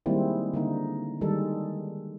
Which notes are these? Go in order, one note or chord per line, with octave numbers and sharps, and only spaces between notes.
D#3 G3 G#3 A#3 C4 E4
D3 A#3 D#4
D#3 G3 G#3 A4